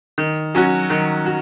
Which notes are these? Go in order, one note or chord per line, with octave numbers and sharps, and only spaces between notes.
D#3
F#3 C#4 F#4
D#3
F#4